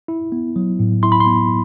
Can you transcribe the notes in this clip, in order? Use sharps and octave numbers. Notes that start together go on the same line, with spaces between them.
E4
B3
F#3
A2
E4 C6
B5
C6
B3